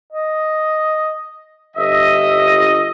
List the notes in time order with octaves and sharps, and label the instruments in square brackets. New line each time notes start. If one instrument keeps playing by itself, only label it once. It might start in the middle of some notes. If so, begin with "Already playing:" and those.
[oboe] D#5
[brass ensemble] G1 D#5 [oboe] E5